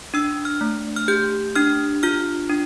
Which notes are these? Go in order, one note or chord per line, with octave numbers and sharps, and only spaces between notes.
D4 E6
F6
A3
F6
G4 G6
D4 F6
F4 F6
D4